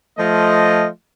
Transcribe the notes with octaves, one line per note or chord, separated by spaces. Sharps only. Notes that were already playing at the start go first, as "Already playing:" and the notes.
F3 A3 F4 D#5